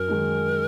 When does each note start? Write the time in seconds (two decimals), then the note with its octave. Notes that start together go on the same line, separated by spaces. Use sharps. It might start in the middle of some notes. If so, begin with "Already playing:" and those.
Already playing: F#2 A#4
0.08 D#3 G#3 D#4